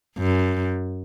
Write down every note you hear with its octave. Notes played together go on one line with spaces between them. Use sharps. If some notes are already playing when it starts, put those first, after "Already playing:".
F#2